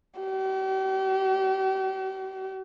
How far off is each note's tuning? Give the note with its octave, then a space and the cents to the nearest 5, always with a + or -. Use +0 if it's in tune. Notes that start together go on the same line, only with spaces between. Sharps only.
G4 -45